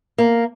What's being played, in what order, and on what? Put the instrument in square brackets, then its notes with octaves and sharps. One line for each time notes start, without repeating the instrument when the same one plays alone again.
[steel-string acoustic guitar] A#3